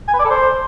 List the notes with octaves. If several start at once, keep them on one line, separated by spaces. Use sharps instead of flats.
G#5
B4
D5
A4
C5